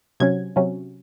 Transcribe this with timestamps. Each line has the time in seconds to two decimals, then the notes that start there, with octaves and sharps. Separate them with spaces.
0.20 C3 F#3 C#4 G#6
0.56 C3 F#3 C#4